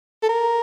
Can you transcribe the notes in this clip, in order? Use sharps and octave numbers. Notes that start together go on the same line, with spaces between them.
A4
A#4